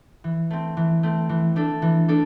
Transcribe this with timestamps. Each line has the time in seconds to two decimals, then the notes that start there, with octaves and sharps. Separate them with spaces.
0.24 E3
0.50 A3 C4
0.77 E3
1.03 A3 C4
1.29 E3
1.56 A3 D4 A4
1.82 E3
2.08 A3 D4 A4